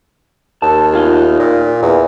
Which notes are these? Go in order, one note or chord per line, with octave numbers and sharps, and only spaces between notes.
D#2 A5
D#4 F4 G#4
A#2
E2